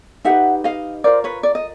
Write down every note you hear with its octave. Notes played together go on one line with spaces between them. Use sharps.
D#4 G4 B4 E5 F#5
D#5 F5
F4 A#4 C5 D5
B4 C#5
D5
D#5